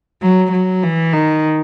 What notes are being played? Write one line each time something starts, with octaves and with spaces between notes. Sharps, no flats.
F#3
F#3
E3
D#3